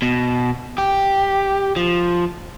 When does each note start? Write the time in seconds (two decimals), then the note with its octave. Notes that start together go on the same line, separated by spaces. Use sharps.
0.02 B2
0.78 G4
1.76 F3